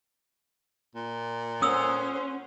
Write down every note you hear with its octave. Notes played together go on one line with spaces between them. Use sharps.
A#2
C#4 A4 C5 F#5 D#6 E6